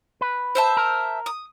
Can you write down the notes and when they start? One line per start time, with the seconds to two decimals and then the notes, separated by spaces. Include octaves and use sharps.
0.21 B4
0.55 C5 E5 A5
0.77 A#4
1.26 D#6